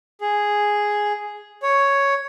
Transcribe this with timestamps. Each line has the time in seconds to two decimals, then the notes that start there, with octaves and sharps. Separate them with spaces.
0.21 G#4
1.63 C#5